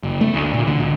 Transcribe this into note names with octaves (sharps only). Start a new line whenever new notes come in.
F#1
A3
D2
A#2
D3
C#2